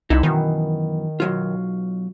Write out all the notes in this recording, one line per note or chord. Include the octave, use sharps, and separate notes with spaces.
C2 D#4 E4
F#2 B2 D#3 E3
B1 F#3 F4